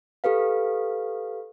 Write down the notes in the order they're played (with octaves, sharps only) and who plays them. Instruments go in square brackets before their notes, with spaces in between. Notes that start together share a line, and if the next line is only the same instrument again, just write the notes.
[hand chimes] G4 A4 B4 F5